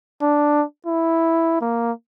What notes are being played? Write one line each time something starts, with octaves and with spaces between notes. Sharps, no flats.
D4
E4
A#3